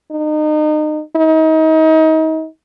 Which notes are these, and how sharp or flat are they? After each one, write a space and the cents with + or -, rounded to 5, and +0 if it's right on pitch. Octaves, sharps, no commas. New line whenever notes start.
D#4 -30
D#4 +30